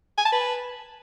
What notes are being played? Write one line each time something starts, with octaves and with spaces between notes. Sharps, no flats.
G#5
A5
B4